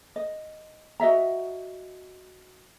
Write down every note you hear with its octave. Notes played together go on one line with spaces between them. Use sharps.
D#5
F#4 D#5 E5 A#5